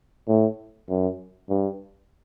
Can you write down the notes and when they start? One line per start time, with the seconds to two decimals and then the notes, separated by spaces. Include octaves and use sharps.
0.28 A2
0.89 F#2
1.50 G2